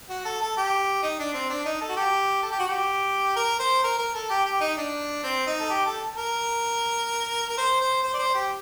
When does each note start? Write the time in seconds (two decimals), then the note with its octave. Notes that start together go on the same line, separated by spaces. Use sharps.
0.09 F#4
0.25 A4
0.42 A4
0.57 G4
1.03 D#4
1.19 D4
1.34 C4
1.50 D4
1.65 D#4
1.81 A4
1.89 F#4
1.97 G4
2.43 A4
2.52 G4
2.59 F#4
2.68 G4
3.36 A#4
3.60 C5
3.84 A#4
3.99 A#4
4.15 A4
4.30 G4
4.46 G4
4.61 D#4
4.78 D4
5.24 C4
5.47 D#4
5.60 A4
5.70 G4
5.86 A4
6.17 A#4
7.49 A#4
7.58 C5
7.81 C5
8.04 C5
8.14 D5
8.19 C5
8.34 G4